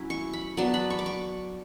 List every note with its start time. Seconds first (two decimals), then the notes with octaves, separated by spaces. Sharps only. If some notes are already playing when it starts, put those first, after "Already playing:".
Already playing: F#3 C#4 E4
0.10 C#6
0.33 B5
0.57 F#3 B3 D4 A5
0.74 B5
0.90 C#6
0.99 D6
1.06 C#6